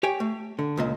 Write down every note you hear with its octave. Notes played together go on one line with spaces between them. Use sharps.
G4 C#5 G5 G#5
A3
D3
C#2 A#2 D#5